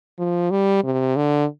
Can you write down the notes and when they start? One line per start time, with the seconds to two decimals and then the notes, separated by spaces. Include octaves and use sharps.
0.19 F3
0.51 G3
0.84 C3
1.16 D3